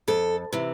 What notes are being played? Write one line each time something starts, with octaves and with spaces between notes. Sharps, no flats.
F2 A4
C3 E3